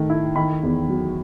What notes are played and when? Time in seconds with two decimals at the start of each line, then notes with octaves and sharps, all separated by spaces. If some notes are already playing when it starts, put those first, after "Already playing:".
Already playing: D#3 A3
0.10 E4
0.36 D#3 B5
0.63 E2
0.89 F#3